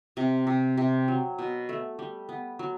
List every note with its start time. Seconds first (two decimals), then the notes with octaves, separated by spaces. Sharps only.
0.17 C3
0.47 C3
0.77 C3
1.08 F#3
1.39 B2
1.69 A3
1.99 G3
2.29 B3
2.59 F#3